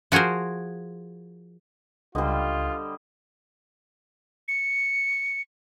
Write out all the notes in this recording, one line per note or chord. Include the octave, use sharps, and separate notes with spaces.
F3 F#4 G#4 A#4 C5
C#2 D3 G3 F4 C5 D#5
C#7